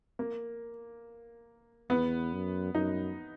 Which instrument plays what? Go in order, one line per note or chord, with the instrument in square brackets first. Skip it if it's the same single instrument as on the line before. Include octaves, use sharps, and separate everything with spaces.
[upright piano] A#3
[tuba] E2 [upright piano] B3
[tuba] F#2
[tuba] F#2 [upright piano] D#4